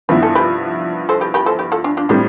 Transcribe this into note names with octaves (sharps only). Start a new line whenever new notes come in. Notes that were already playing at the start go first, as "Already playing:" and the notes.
G2 F3 B3 E4 B4
A4
G4 B4
A4 C5
G4 B4
G4 B4
A4 C5
G4 B4
F4 A4
D4 F4
D4 F4
A2 G3 C4 D4 F4